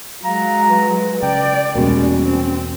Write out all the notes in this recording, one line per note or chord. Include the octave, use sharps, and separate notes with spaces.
F#3 G#3 F5 A#5
B4
C#3 D5 G5
E2 B2 G3 G#3 A#3 C#4 F#4
C4